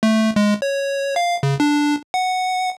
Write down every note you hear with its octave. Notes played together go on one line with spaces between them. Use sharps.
A3
G#3
C#5
F5
C#3
D4
F#5